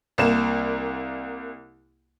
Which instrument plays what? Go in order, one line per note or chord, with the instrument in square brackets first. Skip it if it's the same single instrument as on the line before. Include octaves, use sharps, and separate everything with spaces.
[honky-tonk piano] C2 A#3 E7